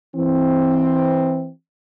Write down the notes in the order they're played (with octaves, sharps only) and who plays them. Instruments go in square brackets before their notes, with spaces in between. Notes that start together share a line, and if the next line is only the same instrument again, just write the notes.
[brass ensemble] E3 C4